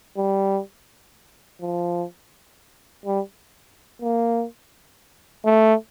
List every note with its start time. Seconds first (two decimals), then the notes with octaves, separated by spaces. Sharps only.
0.17 G3
1.61 F3
3.06 G3
4.02 A#3
5.45 A3